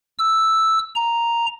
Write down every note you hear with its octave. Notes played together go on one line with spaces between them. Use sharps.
E6
A#5